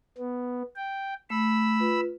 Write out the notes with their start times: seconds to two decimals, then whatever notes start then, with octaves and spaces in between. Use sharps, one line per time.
0.18 B3
0.76 G5
1.30 A3 B5 E6
1.80 F4 B4